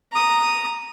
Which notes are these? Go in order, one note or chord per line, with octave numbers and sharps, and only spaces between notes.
A#5 D#6